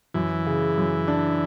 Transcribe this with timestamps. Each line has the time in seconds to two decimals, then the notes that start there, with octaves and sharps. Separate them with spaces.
0.14 F#2 E3
0.46 C#3
0.78 F#2
1.08 D4